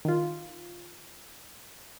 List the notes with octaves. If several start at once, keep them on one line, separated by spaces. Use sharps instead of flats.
D#3 F4